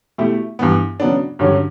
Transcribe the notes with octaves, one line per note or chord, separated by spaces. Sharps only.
B2 A3 E4 G4
G2 E3 B3
C#3 F#3 B3 D4
G2 D3 F#3 C#4 G4